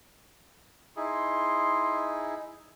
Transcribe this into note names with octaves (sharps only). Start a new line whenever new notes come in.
D#4 E4 G#4 C6